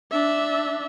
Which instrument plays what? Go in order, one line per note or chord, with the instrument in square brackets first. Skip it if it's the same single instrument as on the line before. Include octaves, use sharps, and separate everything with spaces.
[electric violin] D4 E5